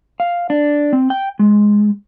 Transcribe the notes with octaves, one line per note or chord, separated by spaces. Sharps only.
F5
D4
C4
G5
G#3